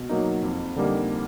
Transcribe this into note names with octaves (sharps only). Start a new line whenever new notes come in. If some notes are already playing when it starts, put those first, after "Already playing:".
Already playing: B2
F#3 A#3 D#4
F2
D3 G3 A#3 D#4